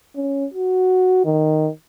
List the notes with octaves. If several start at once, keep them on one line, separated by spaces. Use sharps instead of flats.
C#4
F#4
D#3